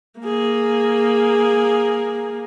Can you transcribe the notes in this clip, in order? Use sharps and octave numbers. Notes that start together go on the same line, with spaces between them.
A#3 G#4